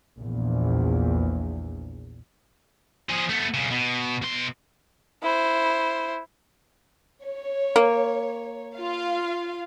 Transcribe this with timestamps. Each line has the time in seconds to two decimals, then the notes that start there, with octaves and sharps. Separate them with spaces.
0.18 A#1 E2
3.09 F3 G#4
3.29 A3 B3
3.54 B1 C#3
3.71 B2
4.22 B2 C6
5.23 E4 C5
7.23 C#5
7.76 A#3
8.75 F4 F5